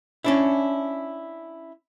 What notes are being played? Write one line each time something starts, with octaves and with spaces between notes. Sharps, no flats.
C#4 D4 E4